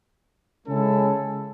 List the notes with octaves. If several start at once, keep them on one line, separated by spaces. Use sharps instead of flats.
C#3 G#3 C#4 E4 A4